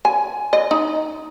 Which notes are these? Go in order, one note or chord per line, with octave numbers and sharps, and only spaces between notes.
G#5
D#5
D#4